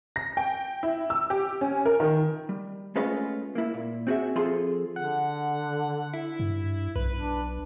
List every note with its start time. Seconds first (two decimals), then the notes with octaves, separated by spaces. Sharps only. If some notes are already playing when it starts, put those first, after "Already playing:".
0.16 A#6
0.37 G5
0.83 E4
1.10 E6
1.30 G4
1.61 C#4
1.86 A#4
2.00 D#3
2.49 G3
2.96 G#3 A3 C#4 F4 B4 D#5
3.55 A#3 E4
3.74 A#2
4.07 C4 F#4 G#4 E5
4.35 F3 C4 F4 G#4 A4 C6
4.96 D3 F#5
6.13 E4
6.40 G2
6.96 B1 B4
7.14 D4